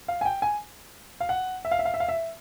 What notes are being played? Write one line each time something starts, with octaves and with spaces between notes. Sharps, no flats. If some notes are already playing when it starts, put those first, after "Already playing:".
F5
G#5
G5
G#5
F5
F#5
E5
F5
E5
F5
E5
F5
E5